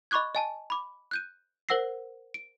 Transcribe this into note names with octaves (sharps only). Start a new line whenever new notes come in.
D#5 B5 C#6 D6 F#6 G#6
D#5 G#5 A5
B5 D6
F#6 G6 D#7
A#4 C5 F#5 E6 A#6 C7
D7